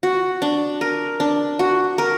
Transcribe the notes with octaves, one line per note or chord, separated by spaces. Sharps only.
F#4
D4
A#4
D4
F#4
A#4